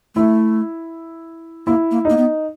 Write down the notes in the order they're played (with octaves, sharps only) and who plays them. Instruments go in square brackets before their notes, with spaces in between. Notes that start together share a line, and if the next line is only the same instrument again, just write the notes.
[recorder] A3 [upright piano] E4
[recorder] A#3 [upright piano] E4
[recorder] A#3
[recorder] A#3 [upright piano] D#4
[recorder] B3